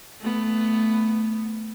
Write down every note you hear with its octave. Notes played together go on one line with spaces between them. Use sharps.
A3 B3